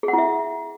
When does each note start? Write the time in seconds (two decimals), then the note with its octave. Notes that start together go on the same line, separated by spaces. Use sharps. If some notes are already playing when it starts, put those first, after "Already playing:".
0.03 G#4
0.08 F#5
0.13 E4
0.18 E5